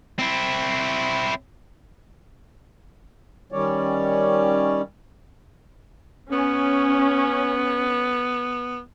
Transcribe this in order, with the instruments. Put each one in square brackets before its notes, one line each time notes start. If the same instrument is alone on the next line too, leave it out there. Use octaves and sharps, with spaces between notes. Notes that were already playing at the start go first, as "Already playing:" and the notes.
[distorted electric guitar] C4 E4
[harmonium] D#3 G3 C#4 C#5 D5
[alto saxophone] B3 [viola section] C#4